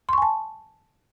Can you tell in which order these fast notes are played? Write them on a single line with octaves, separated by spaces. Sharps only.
C6 C#6 G#5 A5